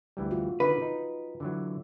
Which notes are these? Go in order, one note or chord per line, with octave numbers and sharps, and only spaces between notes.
D2 E3 G3
F4 F#4
D3 D#3 B4
D#4
D3 E3 F#3